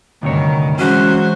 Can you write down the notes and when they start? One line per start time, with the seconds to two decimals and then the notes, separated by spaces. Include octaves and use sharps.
0.23 D2 G2 C3 D#3 C#5
0.79 E3 F#3 G#3 C#4 F#4 C5